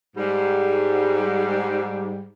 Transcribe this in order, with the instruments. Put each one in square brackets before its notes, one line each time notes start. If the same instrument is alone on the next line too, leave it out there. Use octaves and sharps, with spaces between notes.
[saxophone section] G#2 G3